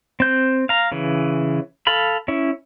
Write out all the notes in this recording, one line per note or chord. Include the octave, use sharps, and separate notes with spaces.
C4 G6
F5 A#5
C#3 E3
A4 F5 B5
C#4 E4